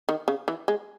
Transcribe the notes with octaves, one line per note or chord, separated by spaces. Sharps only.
D#3
C#3
E3
G#3